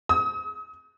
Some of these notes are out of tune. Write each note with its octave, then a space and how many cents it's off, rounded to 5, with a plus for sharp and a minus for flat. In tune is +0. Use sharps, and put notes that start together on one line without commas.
D#6 +40